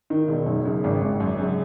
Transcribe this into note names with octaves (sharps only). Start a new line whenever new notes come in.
D#3
E1
F#2
C#3
G#1
G#1
F#2
C#3